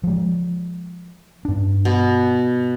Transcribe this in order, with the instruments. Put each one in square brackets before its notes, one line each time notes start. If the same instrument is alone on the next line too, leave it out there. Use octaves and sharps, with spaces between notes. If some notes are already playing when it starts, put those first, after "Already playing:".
[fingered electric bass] F3 G#3
G2 D4
[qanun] B2